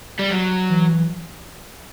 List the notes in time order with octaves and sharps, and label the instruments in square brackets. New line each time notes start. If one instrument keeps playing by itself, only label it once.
[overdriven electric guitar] G3
F#3
[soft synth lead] E3